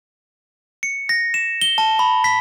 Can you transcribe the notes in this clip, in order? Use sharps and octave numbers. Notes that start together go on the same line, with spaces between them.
C#7
A#6
E7
G7
A5
B5
B6